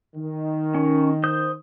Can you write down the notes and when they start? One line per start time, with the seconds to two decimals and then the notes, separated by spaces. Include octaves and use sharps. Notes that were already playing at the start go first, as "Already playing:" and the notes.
0.16 D#3
0.75 C#4
1.24 C5 D#6 G6